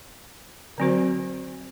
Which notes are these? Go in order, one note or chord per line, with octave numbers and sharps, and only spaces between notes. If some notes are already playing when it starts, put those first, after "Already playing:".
D3 F#3 C4 F#4 C5